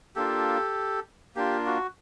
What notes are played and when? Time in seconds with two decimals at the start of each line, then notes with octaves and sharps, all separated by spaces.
0.16 A#3 D4 F4 G4 A4
1.35 A#3 D4 F4 G4
1.66 F#4